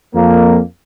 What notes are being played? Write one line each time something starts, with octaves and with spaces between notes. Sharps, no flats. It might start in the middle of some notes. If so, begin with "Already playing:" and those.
F2 A#3